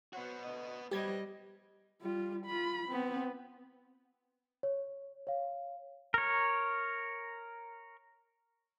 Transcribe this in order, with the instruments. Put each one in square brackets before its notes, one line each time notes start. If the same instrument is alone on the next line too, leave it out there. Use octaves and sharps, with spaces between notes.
[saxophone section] F#3 C5 F#5 [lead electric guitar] B3 F#4
[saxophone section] D2 D#5
[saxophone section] B2 B4 C5 [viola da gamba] G3 D#5 [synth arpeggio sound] G4 G#6
[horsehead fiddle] G3 F4
F4 B5
B3 C4
[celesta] C#5
C#5 F5
[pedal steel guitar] A#4 C#5